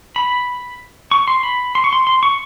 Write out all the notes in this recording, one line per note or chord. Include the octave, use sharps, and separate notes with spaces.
B5
C#6
C6
B5
C6
C#6
C6
C6
C#6